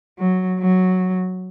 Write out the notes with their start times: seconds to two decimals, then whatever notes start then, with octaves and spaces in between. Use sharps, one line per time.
0.19 F#3
0.59 F#3